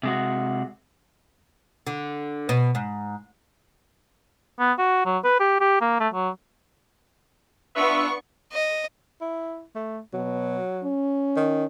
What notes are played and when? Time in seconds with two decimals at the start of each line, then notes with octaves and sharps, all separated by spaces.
0.03 C3 G#3 F#4
1.87 D3
2.49 B2
2.75 G#2
4.59 B3
4.78 F#4
5.05 F#3
5.24 B4
5.40 G4
5.60 G4
5.81 A#3
6.00 A3
6.14 F#3
7.75 B3 D4 F4 B4 E5 C#6
8.53 D#5
9.21 E4
9.75 A3
10.13 B2 F#3
10.84 C#4
11.37 D#3